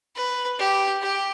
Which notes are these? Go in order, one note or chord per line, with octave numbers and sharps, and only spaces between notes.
B4
G4
G4